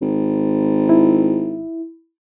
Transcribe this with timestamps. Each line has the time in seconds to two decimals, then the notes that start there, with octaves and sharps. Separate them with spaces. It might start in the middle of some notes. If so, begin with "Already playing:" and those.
0.02 G#1
0.89 E4